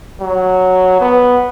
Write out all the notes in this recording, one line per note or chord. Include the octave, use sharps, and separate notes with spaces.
F#3
B3